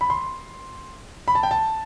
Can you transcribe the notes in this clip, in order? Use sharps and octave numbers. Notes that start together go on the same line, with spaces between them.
B5
C6
B5
A5
G5
A5